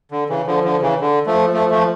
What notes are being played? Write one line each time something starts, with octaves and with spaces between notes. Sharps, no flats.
D3
C#3 E3
D3 F3
D3 F3
C#3 E3
D3
F3 A3
F3 A3
F3 A3